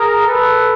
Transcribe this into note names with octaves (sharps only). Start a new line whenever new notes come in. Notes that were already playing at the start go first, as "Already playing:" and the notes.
Already playing: G#4 A#4
A4 B4